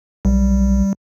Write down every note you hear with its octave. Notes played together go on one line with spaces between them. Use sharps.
B1 G3